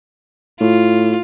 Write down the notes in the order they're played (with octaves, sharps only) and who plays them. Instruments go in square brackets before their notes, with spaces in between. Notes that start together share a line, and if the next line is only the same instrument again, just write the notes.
[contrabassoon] A2 [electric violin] F4